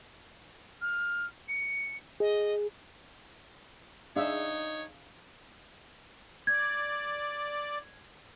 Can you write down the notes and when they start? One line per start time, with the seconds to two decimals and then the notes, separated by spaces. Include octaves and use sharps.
0.82 F6
1.48 C#7
2.20 G#4 D#5
4.16 D4 D#4 G#4 C#5 E5 F5
6.47 D5 G#6